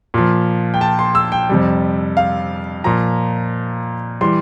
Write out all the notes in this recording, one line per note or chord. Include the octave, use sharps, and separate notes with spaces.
A#2 F3
G5
A5
C6
E6
G5
F2 C3 G3
F5
A#2 F3 A#5
E3 G3 C6